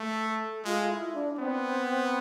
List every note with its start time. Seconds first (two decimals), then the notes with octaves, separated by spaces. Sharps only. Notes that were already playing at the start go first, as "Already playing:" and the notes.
Already playing: A3
0.27 A4
0.64 G#3 F4
0.90 E4
1.14 D4
1.33 D4
1.39 B3 C4